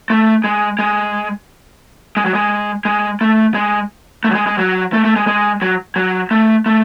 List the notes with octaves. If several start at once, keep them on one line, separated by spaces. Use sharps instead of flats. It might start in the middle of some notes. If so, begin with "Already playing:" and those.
A3
G#3
G#3
G#3
F#3
G#3
G#3
A3
G#3
A3
F#3
G#3
G#3
F#3
A3
A3
G#3
G#3
F#3
F#3
A3
A3